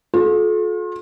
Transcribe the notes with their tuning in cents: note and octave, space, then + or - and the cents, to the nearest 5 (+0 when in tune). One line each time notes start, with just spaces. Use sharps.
F4 +35 A4 -40